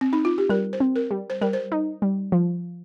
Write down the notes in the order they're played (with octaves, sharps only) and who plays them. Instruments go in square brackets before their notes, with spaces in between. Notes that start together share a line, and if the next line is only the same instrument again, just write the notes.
[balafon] C4
D#4
F4
G4
[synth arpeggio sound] G3 [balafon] A#4
[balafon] C5
[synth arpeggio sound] C4
[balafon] A#4
[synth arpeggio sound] G3
[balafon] C5
[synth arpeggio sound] G3 [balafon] A#4
[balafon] C5
[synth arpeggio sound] D#4
G3
F3